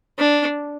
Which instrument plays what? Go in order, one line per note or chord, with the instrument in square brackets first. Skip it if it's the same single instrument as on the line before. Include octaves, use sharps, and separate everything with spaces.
[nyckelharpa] D4